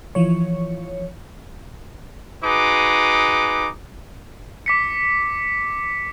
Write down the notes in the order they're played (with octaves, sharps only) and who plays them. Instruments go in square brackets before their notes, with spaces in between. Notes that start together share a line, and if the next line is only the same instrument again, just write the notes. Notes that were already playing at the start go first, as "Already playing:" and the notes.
[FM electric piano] E3 F3 C#5
[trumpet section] D#4 F#4 G#4 B4 D6
[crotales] D6 B6 C#7